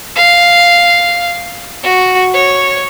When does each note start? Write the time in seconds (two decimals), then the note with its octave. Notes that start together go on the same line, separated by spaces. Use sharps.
0.16 F5
1.83 F#4
2.33 C#5